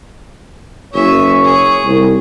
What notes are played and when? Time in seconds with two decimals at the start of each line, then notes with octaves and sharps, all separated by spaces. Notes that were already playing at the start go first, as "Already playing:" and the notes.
0.94 F#1 C#5 E5 G#5
1.44 G#4
1.85 C2